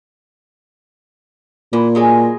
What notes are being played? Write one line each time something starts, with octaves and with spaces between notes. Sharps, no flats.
A#2 E3
F#3 G#3 G#4